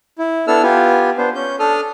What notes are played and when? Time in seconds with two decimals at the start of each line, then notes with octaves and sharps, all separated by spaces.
0.18 E4
0.47 B3 D4 E4 A4 E6 F6
0.63 B3 F4 G4 G#5
1.18 B3 D4 C5
1.35 C#4 G6
1.59 D4 A4 D#6 F6